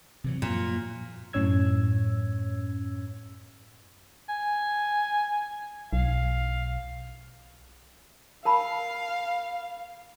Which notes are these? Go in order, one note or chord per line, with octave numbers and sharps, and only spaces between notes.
C3 E3 F#3
F#2 A#2 F3 F#3
F#2 A2 C#4 C#5 E6 G#6
G#5
B1 F5
A#4 F5 A5 B5